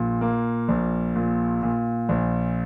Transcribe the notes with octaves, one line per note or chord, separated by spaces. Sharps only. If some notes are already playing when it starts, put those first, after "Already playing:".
Already playing: A#1 A#2
A#3
A#1
A#2
A#2
A#1